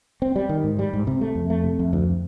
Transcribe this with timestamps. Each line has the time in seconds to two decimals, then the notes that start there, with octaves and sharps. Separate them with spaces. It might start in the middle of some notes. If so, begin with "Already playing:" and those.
0.22 C4
0.36 G3
0.49 D#3
0.64 G#2
0.79 G3
0.93 G#2
1.07 C3
1.21 A3
1.35 F2
1.50 A3
1.64 C3
1.79 F2
1.93 D2